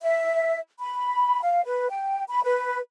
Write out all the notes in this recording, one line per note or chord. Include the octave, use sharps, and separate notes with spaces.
E5
B5
F5
B4
G5
B5
B4